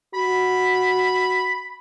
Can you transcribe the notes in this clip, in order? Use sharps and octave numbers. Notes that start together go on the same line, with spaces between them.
F#4 B5